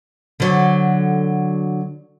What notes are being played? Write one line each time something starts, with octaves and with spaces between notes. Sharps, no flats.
D3 F#3